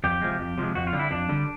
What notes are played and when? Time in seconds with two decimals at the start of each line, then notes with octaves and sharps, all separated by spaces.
0.04 F2 G4
0.21 C3 F3 G#3
0.39 F2
0.58 C3 F3 G#3
0.75 F2 F#4
0.87 F4
0.93 D3 G3
0.99 E4
1.11 F2 D4
1.29 D3 G3